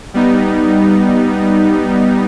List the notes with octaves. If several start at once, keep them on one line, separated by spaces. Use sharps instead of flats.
G3 B3 D#4